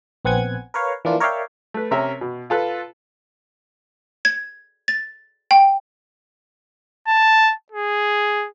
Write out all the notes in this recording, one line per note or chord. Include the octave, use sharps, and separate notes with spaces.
A#1 B3 C4 F#5 G#5 G#6
A#4 B4 C#5 F5
E3 F3 A#3 D4 F4
A#4 C#5 D5 E5 F5 G5
A3 B4
C3 C#4 A#4 E5
B2
F4 A4 B4
G#6
A6
G5
A5
G#4